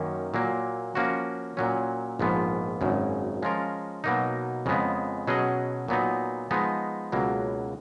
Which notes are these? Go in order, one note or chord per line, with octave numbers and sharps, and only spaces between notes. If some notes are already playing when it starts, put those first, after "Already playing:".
Already playing: F#2 D#3 A#3 C#4
A#2 F#3 A#3
F3 A#3 C#4 F#4
A#2 F#3 C#4
A#1 G#2 F3 B3
G#1 F#2 C#3
F3 G#3 C#4 F4 A#4
B2 F#3 A#3 D#4
F2 C#3 G#3 B3
B2 F#3 C#4 G#4 D#5
A#2 F#3 B3 D#4
F3 G#3 B3 D#4
C#2 B2 F#3 A#3